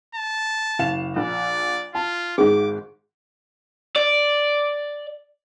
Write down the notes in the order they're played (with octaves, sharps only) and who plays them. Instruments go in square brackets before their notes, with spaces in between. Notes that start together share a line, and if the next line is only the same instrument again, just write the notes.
[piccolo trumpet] A5
[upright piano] F#1 F5 E7
[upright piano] A#1 [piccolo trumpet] D5
[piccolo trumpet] F4 [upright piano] A5
[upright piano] G#1 G#2 [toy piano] G#4 [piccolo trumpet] D6
[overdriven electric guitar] D5